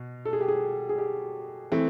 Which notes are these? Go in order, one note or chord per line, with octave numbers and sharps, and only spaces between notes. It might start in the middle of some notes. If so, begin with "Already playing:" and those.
Already playing: B2
A4
G#4
G4
G#4
G#4
G4
E3 A3 C4